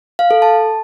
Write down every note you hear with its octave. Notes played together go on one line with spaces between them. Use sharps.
F5
A4
A5